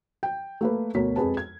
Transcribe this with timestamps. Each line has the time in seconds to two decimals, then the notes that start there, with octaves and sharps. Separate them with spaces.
0.23 G5
0.61 A3 A#3 B4
0.95 D2 B2 A#4 C#5 B6
1.16 F2 G#3 G#4 B4 A5
1.37 G#6